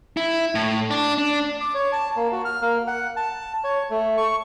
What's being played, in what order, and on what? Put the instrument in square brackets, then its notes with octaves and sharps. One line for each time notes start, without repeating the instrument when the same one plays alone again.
[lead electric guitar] E4
A2
D4
D4
[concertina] D6
C#5
A5
A#3
F#4
F6
A#3
F#5
A5
C#5
A3
C#6